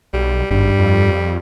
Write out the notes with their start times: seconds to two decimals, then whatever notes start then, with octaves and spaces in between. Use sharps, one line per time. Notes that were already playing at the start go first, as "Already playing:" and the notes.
0.13 B1 G3
0.51 G#1 G2 G3
0.79 F2